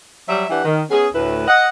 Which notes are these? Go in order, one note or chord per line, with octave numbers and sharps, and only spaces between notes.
F#3 G3 E5
E3 D4 G4 B4 F#5
D#3
B3 C#4 G#4
D2 A2 E4 B4
D#5 F#5